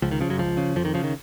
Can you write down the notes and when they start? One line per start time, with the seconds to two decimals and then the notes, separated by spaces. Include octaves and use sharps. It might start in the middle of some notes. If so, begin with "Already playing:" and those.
0.02 C#2 F3
0.11 D#3
0.21 C#3 F3
0.30 F#2 F#3
0.39 C#2 F3
0.57 C#3
0.76 F2 F3
0.85 D#3
0.94 C#3 F3
1.04 D#3